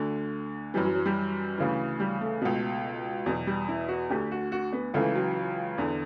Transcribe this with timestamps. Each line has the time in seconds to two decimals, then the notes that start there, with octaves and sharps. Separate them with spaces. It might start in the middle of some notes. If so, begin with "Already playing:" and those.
Already playing: D2 D3
0.74 E3 G3
0.77 F#2
0.85 F#3
0.95 F#3
1.06 G3
1.58 D2 C#3 E3
2.00 G3
2.21 A3
2.41 C#2 B2
3.26 E2 B2 F#3
3.47 G3
3.69 E4
3.88 F#4
4.09 D2 D3 G4
4.31 F#4
4.52 F#4
4.72 B3
4.94 C#2 C#3 E3 A3
5.15 F#3
5.78 E2 D3